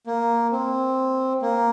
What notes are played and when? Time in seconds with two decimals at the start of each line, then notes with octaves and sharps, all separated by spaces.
0.07 A#3
0.52 C4
1.42 A#3